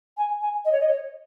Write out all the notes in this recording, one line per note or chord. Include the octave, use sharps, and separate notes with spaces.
G#5
G#5
D#5
C#5
D#5
C#5